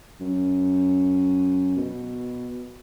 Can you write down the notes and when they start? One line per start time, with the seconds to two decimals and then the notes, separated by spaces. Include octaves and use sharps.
0.20 F#2
1.77 B2